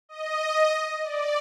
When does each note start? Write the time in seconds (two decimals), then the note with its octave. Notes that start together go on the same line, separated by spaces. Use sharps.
0.09 D#5
1.03 D5